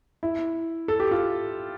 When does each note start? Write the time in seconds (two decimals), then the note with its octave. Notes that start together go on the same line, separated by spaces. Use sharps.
0.23 E4
0.88 A4
1.00 G4
1.11 F4